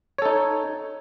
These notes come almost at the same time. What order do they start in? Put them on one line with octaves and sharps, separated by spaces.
C#5 A4 D#4